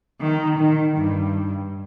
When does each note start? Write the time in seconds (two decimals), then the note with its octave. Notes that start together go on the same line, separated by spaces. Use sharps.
0.20 D#3
0.59 D#3
0.97 G2